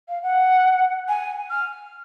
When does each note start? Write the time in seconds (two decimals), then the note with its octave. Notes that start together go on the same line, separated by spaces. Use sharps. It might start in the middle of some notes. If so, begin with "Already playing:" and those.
0.08 F5
0.22 F#5
1.09 G#5
1.51 F6